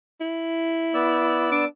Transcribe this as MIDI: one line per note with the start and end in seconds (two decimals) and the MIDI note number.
0.21 1.50 64
0.94 1.65 59
0.94 1.65 74
0.94 1.65 88
1.52 1.66 62